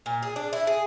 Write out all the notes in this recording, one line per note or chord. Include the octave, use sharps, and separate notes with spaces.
A#2
G#4
D4
E4
G#4